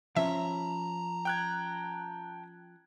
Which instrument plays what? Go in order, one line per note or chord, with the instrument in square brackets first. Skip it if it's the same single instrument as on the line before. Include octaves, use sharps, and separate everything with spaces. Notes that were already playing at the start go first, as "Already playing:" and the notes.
[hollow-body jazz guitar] F3 C#4 C#5 [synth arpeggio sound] E5 [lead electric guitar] A5 A#5
[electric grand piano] G5 F#6 G#6